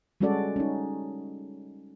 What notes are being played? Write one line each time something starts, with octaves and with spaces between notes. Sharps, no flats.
G3 G#3 C#4 F#4 A4 D5
C#4 D#4